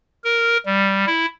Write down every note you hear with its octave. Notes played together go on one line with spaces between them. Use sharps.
A#4
G3
E4